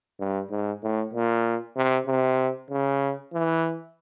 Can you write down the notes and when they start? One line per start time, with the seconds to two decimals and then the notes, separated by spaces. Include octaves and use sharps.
0.20 G2
0.50 G#2
0.83 A2
1.13 A#2
1.76 C3
2.07 C3
2.71 C#3
3.33 E3